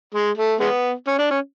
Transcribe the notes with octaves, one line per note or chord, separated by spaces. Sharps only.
G#3
A3
G#3 B3
C#4
D4
C#4